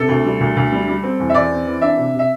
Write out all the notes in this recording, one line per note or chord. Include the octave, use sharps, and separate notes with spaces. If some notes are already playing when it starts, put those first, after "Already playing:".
Already playing: C3 A4
D2
G3
D2
D2
G3
G3
C4
E2
E5
E2 D5
C4
E3
D4 E5
C3
C3
E5